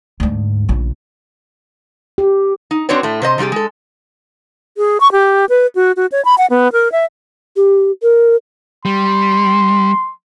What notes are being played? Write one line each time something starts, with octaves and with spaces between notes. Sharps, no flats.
D2 G#2
A#1 C#3
G4
D#4
C4 D4 F#4 B4 C#5 D5
A2 A3
C3 C5 D#5
C3 G3 D#4 G4 G#4
G#3 A4
G#4
C#6
G4
B4
F#4
F#4
C#5
B5
F#5
B3
A#4
E5
G4
A#4
G3 C6